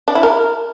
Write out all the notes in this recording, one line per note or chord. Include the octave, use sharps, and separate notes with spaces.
D4
E4
A#4